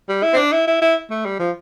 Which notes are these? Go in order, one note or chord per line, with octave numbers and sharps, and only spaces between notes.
G3
E4
C4
D4
E4
E4
E4
A3
G3
F3